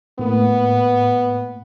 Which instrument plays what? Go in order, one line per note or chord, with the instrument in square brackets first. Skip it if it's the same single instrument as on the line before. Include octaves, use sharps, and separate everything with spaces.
[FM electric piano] A2 A#3 [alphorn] B3